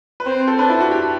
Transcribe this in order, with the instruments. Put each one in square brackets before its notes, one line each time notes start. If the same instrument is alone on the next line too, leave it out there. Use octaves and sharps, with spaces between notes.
[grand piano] B4
[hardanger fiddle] C4 [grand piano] C5
[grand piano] A4
[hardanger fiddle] D4 [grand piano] B4
[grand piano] E4
F#4
G4